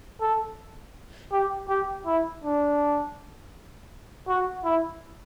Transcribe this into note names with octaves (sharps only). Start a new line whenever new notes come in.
A4
G4
G4
E4
D4
F#4
E4